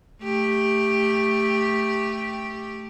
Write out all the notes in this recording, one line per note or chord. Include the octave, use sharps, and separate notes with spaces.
A3 G4